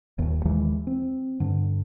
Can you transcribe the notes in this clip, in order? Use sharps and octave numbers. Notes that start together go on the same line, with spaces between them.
D#1 D#2
D#2 D#3 E3 G#3
C4
G2 D3